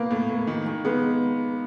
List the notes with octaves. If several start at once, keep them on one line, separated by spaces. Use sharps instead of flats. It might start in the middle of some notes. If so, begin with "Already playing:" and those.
Already playing: A#3 B3
A2
A2
D#3
D#3
G#3 B3